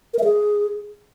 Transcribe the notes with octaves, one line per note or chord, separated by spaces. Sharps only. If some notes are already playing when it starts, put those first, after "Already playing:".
A#4
E5
G#4